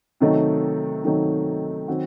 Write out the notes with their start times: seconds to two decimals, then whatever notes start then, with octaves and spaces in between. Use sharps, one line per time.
0.20 C3 D#3 F#3 A3 D#4
1.04 C3 D#3 F#3 A3 D#4
1.88 D#3 F#3 C4 F#4